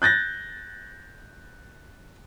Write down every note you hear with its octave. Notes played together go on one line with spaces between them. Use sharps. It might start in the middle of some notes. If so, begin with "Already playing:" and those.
F#6 G6 A6 A#6